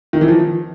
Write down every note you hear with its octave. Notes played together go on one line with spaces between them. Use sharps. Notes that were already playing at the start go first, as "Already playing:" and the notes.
D#3
E3
F3